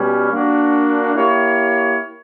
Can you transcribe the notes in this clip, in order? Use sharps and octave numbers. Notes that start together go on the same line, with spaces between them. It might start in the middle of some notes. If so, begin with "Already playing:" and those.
Already playing: B2 G3 C#4
A#3 D4 F#4
A#3 E4 G4 C#5